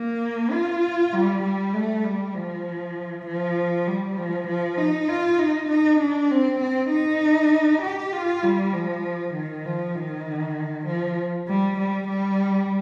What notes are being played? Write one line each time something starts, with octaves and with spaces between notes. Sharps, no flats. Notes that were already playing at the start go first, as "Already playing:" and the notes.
Already playing: A#3
F4
G3
G3
A3
G3
F3
F3
G3
F3
F3
D#4
F4
D#4
D#4
D4
C4
C4
D#4
G4
F4
G3
F3
D#3
F3
D#3
F3
G3
G3
G3